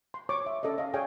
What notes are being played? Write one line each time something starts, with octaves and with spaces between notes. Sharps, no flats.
C6
C#5 C#6 D6
E5
C#4 A4 D5 D#5
D#5 F5
G#4 C#5 D5 F5 G5 G#5